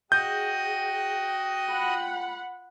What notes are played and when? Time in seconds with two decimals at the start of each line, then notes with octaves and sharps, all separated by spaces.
0.12 F#4 G#4 D#5 G5 D#6 G6
1.70 F4 F#5 B5